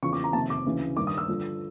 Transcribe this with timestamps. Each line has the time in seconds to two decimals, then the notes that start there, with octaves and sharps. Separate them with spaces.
0.03 E2 C#3 F3 C#6
0.13 D6
0.24 A#5
0.33 F2 C3 D#3 A5
0.50 D6
0.66 D2 C#3 E3
0.97 G2 D#3 D6
1.07 D#6
1.18 E6
1.28 G2 D3 F3